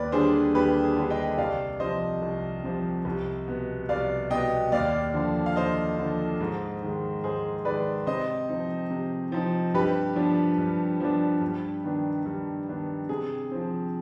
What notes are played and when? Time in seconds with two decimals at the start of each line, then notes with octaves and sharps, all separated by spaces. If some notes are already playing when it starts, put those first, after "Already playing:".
Already playing: D#2 B4 D5
0.12 D3 G3 D4 G#4 C5
0.54 D#2 G4 B4
0.83 G#4
0.96 D3 G3 D4
1.10 D#5 G5
1.38 C2 D5 F5
1.80 C3 F3 C5 D#5
2.22 C2
2.64 C3 F3
3.05 C2
3.48 B2 B3
3.89 C2 D5 F5
4.30 B2 B3 D#5 G5
4.72 D#2 D5 F5
5.14 D3 F3
5.46 F5
5.56 D#2 C5 D#5
5.99 D3 F3
6.41 G#2
6.82 D#3 G#3
7.24 G#2 G#4 C5
7.65 D#3 G#3 B4 D5
8.07 C3 C5 D#5
8.49 F3 C4 D#4
8.90 C3
9.32 F3 C4 D#4
9.74 G2 G4 B4
10.16 F3 B3 D4
10.58 G2
11.00 F3 B3 D4
11.41 G2
11.84 D#3 B3 D4
12.26 G2
12.68 D#3 B3 D4
13.09 C3 G#4
13.51 F3 C4